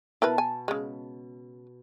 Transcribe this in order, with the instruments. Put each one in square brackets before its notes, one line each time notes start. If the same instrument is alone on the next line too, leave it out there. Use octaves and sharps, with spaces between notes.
[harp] B2 A5 [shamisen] E4 A#4 B4
[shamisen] G#5
C#3 G#3